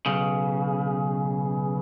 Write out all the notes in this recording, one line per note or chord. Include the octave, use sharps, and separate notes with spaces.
B1 C#3